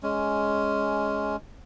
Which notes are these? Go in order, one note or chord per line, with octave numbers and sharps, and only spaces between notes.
G#3 C#4